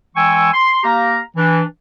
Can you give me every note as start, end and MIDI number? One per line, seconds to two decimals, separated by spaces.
0.16 0.49 52
0.16 0.49 56
0.16 0.49 79
0.16 0.49 80
0.16 0.49 85
0.16 0.49 88
0.53 0.82 84
0.84 1.20 58
0.84 1.20 67
0.84 1.20 77
0.84 1.20 82
1.37 1.63 52
1.37 1.63 62